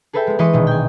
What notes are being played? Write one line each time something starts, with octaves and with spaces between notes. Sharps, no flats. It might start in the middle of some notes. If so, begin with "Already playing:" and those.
G#4 A4 B4 E5 G5
G#3 B3
E3 G#3 B4 D#5 C#6 D#7
A#1 B2 D#3
G5 G#5